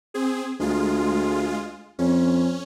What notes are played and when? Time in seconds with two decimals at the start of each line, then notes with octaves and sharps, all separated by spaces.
0.14 C4 G#4
0.60 D2 G#3 F4
1.99 F2 C#4